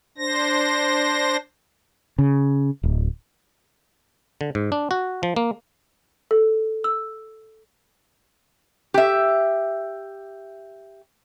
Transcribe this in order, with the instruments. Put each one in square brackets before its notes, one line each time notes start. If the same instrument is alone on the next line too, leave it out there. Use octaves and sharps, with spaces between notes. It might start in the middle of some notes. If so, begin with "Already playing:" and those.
[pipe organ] D4 C5 A#6
[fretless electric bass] C#3
D1
[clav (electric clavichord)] D3
G#2
D4
F#4
F3
A#3
[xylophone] A4
E6
[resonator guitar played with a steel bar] G4 E5